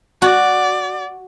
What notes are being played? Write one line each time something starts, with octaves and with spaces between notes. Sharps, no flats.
F#4 D5